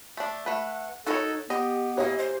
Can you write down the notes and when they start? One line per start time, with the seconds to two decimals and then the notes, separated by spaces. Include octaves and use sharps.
0.17 A3 D4
0.46 A3 B4 F#5
1.06 D#4 F#4 A4 A#4 C#5
1.50 B3 G4 D#5
1.97 E3 A#3 G4 C#5 D#5
2.19 C5